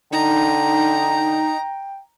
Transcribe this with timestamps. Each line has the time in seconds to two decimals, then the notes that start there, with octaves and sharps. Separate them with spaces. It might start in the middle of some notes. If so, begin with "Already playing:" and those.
0.12 D3 D#4 G5 A#5